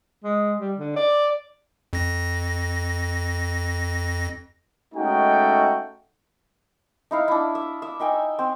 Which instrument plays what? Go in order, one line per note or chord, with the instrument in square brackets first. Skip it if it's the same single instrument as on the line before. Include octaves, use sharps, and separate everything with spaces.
[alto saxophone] G#3
G3
D3
D5
[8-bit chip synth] F2 A#6
[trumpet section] G#3 A3 C#4 D#4 F#4 G5
[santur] D#4 E4 F5
D4 E4
E5
E5
D#4 E5 G5 G#5
C4